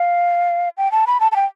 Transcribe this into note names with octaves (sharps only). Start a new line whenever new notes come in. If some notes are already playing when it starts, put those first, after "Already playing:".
Already playing: F5
G5
A5
B5
A5
A5
G5